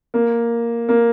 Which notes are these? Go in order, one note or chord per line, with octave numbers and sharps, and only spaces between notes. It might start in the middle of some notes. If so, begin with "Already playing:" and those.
A#3
A#3